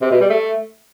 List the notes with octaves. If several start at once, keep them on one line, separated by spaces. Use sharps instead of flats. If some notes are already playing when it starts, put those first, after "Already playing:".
C3
B2
G3
A3